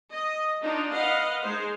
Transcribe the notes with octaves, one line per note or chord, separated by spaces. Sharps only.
D#5
D4 D#4 F4
B4 D#5 F5 F#5
G#3 D#4 C5